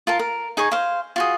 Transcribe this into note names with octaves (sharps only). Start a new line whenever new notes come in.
F4 A#4 A5
A#4
D#4 G#4 G#5 C#6
C5 F5
F4 F#4 G#4